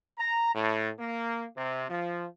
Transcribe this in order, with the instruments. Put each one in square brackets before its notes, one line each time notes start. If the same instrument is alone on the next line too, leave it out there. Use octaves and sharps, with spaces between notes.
[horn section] A#5
A2
A#3
C3
F3